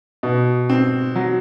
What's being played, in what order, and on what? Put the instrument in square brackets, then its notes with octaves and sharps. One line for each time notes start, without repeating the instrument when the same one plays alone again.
[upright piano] B2
C4
F#3